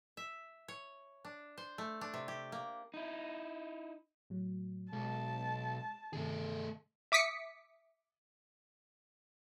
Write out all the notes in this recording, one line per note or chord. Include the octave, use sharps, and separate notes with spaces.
E5
C#5
D4
C5
A3
D4
C3
G4
A#3
D#4 E4
A2 F#3
B1 G#3 A5
G2 C3 D#3 A3 G#4
E5 D6 D#6 B6 C#7